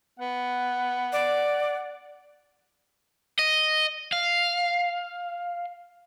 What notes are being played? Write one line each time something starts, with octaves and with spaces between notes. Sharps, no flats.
B3 F#5
D5
D#5
F5